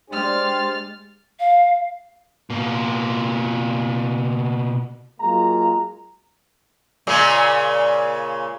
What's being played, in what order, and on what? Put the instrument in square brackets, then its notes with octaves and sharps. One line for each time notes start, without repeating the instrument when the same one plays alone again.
[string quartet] G#3 F6 A6 [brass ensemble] D4 G4 C5
[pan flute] F5
[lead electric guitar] B2 A#3
[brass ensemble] F#3 G#3 A#3 F4 A#5
[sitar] A#2 C#3 G#3